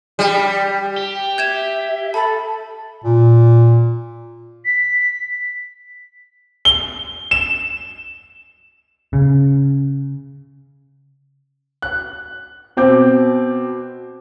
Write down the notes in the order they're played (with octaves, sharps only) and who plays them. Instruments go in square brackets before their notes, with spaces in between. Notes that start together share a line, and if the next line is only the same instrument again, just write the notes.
[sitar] G3
[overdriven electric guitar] G4
[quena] E5 [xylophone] G6 G#6 E7
[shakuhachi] A4 [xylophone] A5 [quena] B5
[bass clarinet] A#2
[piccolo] B6
[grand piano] G7
E7
[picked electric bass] C#3
[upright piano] F#6
B2 C4 D6 G6